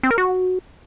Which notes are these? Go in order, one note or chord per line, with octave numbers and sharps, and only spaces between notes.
C4
A#4
F#4